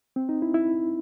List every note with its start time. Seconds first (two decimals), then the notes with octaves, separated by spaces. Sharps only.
0.16 C4
0.29 D#4
0.42 E4
0.54 E4